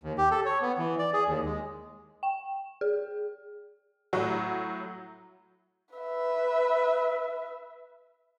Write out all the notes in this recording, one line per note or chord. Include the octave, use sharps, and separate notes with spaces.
D#2
G4
A4
C#5
B3
E3
D5
G#4
D#2
G#3
G5
G#4
A2 F#3 F#4
B4 E5